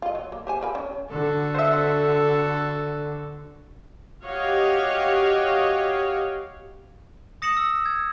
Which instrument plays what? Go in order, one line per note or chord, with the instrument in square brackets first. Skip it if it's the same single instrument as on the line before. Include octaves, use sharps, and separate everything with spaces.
[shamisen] F4 D#5
F#3
A#3
G4 C5 G#5
F3 A#4 B5
C#4
[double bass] D3 [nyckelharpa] F#4 A4
[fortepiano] C5 E5
[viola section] F#4 G4 C#5 D#5 F5
[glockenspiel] D#6 A#6 C#7 E7 F#7
E6
G#6